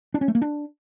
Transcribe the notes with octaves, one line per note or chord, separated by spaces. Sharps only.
D4
C#4
A3
A#3
D4